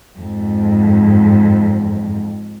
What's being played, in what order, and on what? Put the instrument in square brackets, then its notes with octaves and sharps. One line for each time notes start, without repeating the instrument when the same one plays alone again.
[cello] F2 G#2